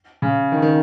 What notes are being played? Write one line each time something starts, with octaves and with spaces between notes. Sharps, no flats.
C#3
D#3
D#3